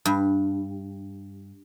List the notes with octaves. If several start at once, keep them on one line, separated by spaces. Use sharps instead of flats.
G2